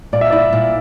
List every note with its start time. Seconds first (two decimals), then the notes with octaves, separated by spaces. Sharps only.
0.13 A#2 D5
0.21 E5
0.31 E4 D5
0.53 A#2